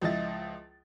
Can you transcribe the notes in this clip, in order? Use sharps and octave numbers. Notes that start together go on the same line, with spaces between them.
C#2 F3 E4 D#5 A6